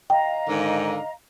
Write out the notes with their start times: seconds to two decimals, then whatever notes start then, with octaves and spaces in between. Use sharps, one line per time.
0.10 D#5 F5 G5 A#5
0.48 G#2 D3 D#3